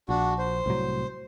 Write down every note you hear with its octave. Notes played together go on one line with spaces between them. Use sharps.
A#1 D4 F#4
C5
C2 A2 F#3